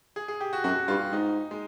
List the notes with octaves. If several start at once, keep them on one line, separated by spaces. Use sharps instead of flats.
G#4
G#4
G4
F#4
F#2 F#4
G2 F4
G#2 D#4
G#3